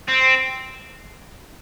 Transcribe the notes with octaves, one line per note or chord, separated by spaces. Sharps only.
C4